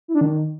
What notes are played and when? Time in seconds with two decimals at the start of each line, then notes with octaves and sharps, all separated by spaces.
0.08 E4
0.15 D4
0.21 D#3